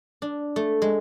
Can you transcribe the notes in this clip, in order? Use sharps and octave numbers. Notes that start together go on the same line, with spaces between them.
D4
A3
G#3